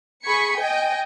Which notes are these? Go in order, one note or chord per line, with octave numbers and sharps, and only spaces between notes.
G#4 B5 C#6 G#6 B6 C#7
D#5 G5 G#5